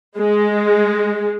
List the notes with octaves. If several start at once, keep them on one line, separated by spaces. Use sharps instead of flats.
G#3